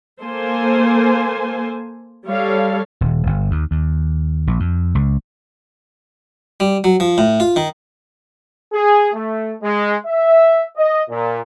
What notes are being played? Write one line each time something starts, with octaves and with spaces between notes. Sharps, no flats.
A#3 A4 C5 G#5
G3 A4 C#5 F5
D#1
G1
D#2
D#2
A#1
F2
C#2
G3
F#3
F3
A2
F4
D#3
G#4
A3
G#3
E5
D#5
A#2